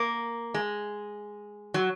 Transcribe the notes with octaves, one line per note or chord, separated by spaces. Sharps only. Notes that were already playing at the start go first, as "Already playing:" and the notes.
Already playing: A#3
G#3
F#3